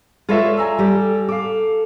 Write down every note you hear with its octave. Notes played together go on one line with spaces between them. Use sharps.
G#3 F4 A4 B4 C#5 E5
D5
G#5 A#5 E6
G3 G4 A4
A4 F5 D6